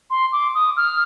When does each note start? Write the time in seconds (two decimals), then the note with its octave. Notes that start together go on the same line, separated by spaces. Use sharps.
0.10 C6
0.32 D6
0.55 D#6
0.77 F6